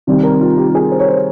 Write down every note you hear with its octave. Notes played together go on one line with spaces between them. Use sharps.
C3 D#3 G3 C4
A#4
F4
G4
G4
G#4
C5
C#5
C5